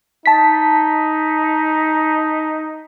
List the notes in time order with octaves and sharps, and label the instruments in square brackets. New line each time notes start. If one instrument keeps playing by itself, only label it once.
[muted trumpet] D#4 [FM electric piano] A5 B6